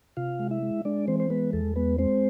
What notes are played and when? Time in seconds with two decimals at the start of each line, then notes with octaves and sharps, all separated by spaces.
0.17 C3 F4 F5
0.39 G#3
0.51 E4 E5
0.63 G#3
0.85 G#3 D4 D5
1.08 E3 C4 C5
1.20 C5
1.30 G#3 B3 B4
1.53 E2 A4
1.76 G#3 B3 B4
1.98 G#3 C4 C5